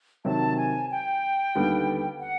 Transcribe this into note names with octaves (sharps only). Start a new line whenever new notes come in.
C3 D#3 F#3 A5
G#5
G5
D#2 D3 G3 B3
F#5